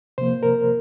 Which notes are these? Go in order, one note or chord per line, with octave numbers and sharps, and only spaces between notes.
C3 F3 A#3 C5
A#4